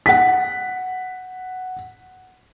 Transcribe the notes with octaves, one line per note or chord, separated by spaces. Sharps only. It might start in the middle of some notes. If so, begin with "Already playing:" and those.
F#5 B6